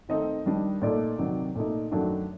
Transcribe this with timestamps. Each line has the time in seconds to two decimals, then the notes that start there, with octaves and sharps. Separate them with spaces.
0.09 D#3 A3 C4 D#4 D#5
0.46 D#3 G3 D4
0.82 A#2 A3 D#4 D5
1.19 C3 D#3 F#3
1.55 A#2 A3 D#4
1.91 F#2 D#3 F#3 A3 D4